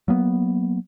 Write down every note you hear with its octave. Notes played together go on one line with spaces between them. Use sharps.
F#3 A#3 B3